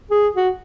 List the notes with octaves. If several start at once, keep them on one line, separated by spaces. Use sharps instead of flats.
G#4
F#4